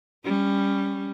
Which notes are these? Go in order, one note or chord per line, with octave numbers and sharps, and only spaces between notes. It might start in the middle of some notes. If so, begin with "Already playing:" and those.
G3 C#4